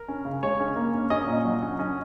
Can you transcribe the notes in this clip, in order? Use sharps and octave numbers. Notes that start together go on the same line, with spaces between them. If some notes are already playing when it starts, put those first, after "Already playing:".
Already playing: A#4
C#4
C#3
G#3 C#5
C#4
A#3
C#4
C#4 D#5
A#2
F#3
C#4
C#4 D#5